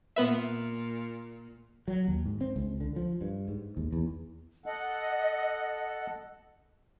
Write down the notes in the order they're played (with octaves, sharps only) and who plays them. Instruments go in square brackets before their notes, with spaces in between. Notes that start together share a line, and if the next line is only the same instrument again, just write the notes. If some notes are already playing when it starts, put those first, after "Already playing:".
[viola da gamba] A#2 [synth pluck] B3 B4 E5
[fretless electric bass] F#3
D#2
G#2
C4
C#2
D3
F3
G2
G#2
D#2
E2
[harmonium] A4 F#5 [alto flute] D#5